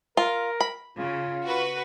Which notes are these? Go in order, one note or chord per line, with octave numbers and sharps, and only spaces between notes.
F4 A#4
B5
C#3 F4
F#4 B4